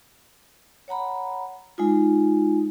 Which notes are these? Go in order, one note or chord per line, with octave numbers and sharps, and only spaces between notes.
C#5 F#5 A#5 B5
G#3 D#4 F4